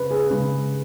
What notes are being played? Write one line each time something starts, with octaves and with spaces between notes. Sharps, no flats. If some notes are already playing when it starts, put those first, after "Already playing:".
Already playing: C#3 B4
G#4
C#3 G#3